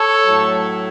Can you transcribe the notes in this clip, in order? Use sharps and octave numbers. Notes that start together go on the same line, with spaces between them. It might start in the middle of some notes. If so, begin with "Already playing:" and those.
Already playing: A4 C#5
A2 F#3